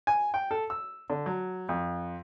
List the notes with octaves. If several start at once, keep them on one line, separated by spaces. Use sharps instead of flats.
G#5
G5
A4
E6
D3
F#3
F2